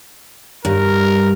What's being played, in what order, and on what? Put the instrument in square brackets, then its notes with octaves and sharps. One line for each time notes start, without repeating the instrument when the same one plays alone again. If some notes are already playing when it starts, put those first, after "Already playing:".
[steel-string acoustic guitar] G2 [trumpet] A#4